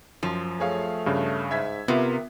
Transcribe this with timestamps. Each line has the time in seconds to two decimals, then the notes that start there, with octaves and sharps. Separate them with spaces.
0.23 F#2 F3
0.60 A3 G#4 C#5 F5
1.06 G2 C#3
1.51 G#2 E5 G#6 B6
1.88 C3 B3 F4 A#4